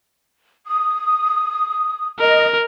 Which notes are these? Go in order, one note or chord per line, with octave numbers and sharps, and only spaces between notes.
D#6
A#4 D#5